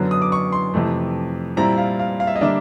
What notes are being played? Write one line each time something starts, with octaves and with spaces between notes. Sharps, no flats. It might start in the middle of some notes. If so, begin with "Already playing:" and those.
Already playing: F#2 D3 F#3 B3
D#6
D6
C#6
C6
F2 C3 E3 A3
A#2 G3 C4 E4 A#5
F5
F5
F5
E5
D#5
D3 G3 A#3 D4 E5